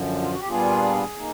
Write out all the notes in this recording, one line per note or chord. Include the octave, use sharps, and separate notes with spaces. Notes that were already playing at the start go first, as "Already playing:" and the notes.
Already playing: F#2 D3 F3
F4
F#4
G4
A#2 G3 B3 D4 F4 G#4
A#3 D#4